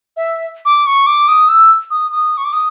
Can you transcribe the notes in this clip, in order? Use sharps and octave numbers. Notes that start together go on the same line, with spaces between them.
E5
D6
C#6
D6
D#6
E6
D#6
D#6
C#6
D6
D#6